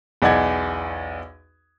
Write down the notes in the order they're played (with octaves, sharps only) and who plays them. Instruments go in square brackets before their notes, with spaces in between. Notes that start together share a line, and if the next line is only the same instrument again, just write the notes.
[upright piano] B1 E2 D5 D#5 F#5 G#6